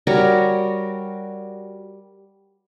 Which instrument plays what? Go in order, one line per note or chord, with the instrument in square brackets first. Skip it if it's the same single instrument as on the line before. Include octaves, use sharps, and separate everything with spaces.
[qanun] G3 F#4 A#4 C#5